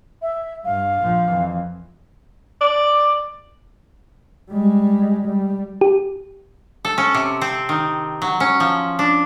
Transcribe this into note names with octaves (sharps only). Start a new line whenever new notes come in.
E5
G2 F5
A#1 F3
F2 E3
D5
G3 G#3
G3
G4
A4
C#4
C3
C4
D#3
F#3
C#4
F3
D4